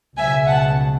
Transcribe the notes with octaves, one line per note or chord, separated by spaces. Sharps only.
C#2 B2 F#3 E5 G#5
F#5 A5